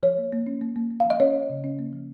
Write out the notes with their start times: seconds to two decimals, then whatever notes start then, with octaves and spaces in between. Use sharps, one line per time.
0.03 F3 C#5
0.18 A#3
0.33 A#3
0.47 C#4
0.61 A#3
0.76 A#3
0.91 A#3
1.00 F5
1.05 F3 D#5
1.20 C#4 C#5
1.35 C#4
1.50 C#3
1.64 C#4
1.79 A#3
1.93 F3